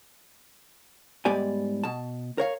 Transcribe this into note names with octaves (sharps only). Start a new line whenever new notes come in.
G#2 G3 B3 G4 D5 G#5
B2 A5
A#4 C#5 F5